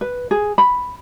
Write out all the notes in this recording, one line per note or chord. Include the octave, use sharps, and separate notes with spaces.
B4
G#4
B5